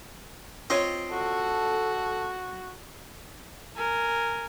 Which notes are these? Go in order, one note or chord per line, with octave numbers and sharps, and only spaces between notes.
C4 F4 C#5 D#5
F#4 A4
A#4 G#5